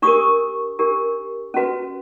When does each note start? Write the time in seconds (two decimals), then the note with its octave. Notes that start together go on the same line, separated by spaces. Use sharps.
0.02 D4 G4 A#4 C#6 D#6
0.79 D4 G4 A#4
1.54 C#4 F#4 B4